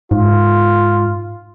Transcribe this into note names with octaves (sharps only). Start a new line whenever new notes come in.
G#2 F4